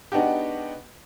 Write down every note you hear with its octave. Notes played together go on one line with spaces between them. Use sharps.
G#3 B3 D4 D#4 F#4 G4